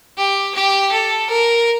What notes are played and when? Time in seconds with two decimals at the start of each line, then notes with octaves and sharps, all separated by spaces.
0.17 G4
0.55 G4
0.92 A4
1.30 A#4